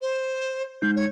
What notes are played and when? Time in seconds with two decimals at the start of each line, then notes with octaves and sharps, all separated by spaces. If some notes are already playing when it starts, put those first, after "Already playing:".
0.02 C5
0.82 G#3 D#4 G6
0.96 C#5